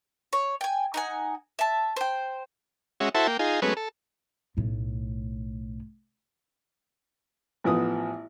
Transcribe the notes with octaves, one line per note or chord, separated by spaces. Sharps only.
C#5
G5 G#5
D#4 F#5 G#5
E5 A5
C5 G5
G#3 C#4 F#4 E5
E4 F#4 A4 C5 E5 A5
A#3 G5
D#4 F4 G#4
F#3 G#3 A3 B3 C#4 B4
A4
B1 A2
A1 F3 B3 D#6